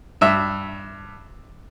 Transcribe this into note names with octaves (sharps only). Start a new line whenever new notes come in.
G2 E5